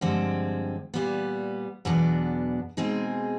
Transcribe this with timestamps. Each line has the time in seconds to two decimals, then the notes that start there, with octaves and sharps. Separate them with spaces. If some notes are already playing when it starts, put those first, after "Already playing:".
0.01 G2 D3 F3 G#3 C4
0.94 A#2 G3 B3
1.85 E2 B2 F#3 B3 D4
2.77 B2 G#3 C4 D#4 G#4